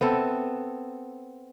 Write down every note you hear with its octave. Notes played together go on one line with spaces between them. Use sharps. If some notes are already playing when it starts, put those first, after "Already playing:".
B3 C4 A4 E5